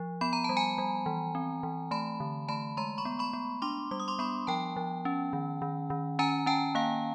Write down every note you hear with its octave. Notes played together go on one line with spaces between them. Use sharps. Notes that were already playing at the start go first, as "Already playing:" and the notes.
Already playing: F3
B3 B5
A#5
G3 A5
G#5 A#5
G3
E3
C4
E3
A3 A5 B5
D3
A3 A5 B5
G#3 A#5 C6
B5 C#6
B3
B5 C#6
B3
D4 C6 D6
G3 D6
D#6
C6 D6
B3 B5 C#6
F3 G5 A5
F3
C#4
D#3
D#3
D#3
C#4 G#5 A#5
C#4 G5 A5
A#3 F5